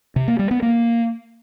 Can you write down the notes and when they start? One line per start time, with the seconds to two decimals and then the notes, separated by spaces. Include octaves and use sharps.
0.16 C3
0.28 A#3
0.39 G3
0.51 B3
0.62 A#3